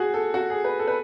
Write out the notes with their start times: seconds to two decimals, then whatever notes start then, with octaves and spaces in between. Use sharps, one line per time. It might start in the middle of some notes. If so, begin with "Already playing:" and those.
Already playing: F#4 G#4
0.14 A4
0.34 F#4
0.50 G#4
0.64 B4
0.79 A4
0.87 B4